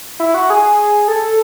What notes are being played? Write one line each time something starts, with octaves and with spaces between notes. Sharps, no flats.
E4
F#4
G#4
A4